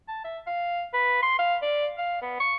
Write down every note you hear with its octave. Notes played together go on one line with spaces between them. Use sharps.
A5
E5
F5
B4
C6
F5
D5
F5
B3
C#6